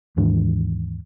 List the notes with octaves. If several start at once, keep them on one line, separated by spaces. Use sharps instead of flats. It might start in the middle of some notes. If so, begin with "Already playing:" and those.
D#2 G#2 E3 D4